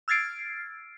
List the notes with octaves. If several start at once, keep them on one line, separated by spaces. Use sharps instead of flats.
E6 F6 G#6 A6 C7 D7